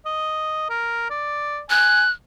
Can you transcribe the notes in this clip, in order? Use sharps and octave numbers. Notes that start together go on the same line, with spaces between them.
D#5
A#4
D5
G#5 F#6